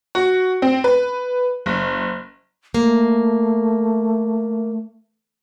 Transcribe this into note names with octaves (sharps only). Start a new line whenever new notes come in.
F#4
C4
B4
F#1
A3 A#3